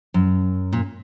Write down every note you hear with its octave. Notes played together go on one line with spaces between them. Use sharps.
F#2
A#2